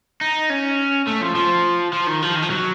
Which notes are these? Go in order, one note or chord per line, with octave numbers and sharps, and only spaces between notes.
D#4
C#4
A3
F3
F3
F3
D#3
F3
D#3
F3
F#3